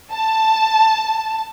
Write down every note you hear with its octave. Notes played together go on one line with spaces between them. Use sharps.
A5